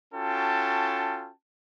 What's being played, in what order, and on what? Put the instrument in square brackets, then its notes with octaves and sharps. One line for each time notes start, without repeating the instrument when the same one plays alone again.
[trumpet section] C#4 F4 F#4 A4 G5 A5